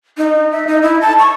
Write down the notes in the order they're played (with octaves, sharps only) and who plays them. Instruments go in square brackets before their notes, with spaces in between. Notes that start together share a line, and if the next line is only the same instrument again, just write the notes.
[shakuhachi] D#4
E5
D#4
E4
A5
C#6